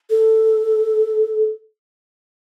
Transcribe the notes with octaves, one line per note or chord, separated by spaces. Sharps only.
A4